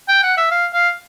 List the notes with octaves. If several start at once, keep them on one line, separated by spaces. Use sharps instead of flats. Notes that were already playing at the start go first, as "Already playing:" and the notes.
G5
F#5
E5
F5
F5